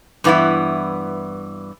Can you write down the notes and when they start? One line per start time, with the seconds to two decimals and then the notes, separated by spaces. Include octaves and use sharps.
0.24 G2 E3 B3 E4